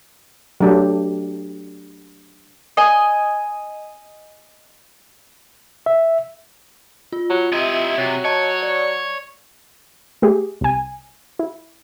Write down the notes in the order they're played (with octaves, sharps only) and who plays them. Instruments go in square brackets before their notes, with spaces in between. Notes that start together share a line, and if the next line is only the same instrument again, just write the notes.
[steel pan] F#3 A3 D4 G4
[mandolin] D#5 G#5
[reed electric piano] E5
[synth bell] F4
[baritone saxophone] F#3
[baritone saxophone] C3 [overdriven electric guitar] E4 D#5
[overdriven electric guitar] C3 [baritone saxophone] F#3
[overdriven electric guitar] C#5 [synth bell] D#5 A5
[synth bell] D5
[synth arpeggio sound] A3 G4 G#4
C2 G#5
E4